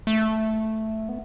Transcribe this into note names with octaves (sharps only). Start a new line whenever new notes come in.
A3
B3